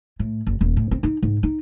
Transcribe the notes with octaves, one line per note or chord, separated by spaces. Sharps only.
A2
F#1
D#1
A2
C4
D#4
G#2
D#4